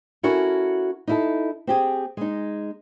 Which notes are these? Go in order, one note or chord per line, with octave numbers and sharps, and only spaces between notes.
C#4 E4 F#4 A4 A#4
D#4 E4 A4
C4 G4 G#4
G#3 D#4